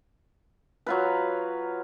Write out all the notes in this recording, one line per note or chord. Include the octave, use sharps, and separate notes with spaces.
F#3 F4 B4